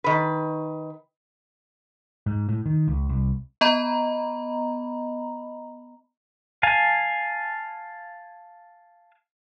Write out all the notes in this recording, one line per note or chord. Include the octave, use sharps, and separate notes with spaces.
D#3 B4
G#2
A2
D#3
C#2
C2
B3 D#5 A#5 B5
F5 G#5 A5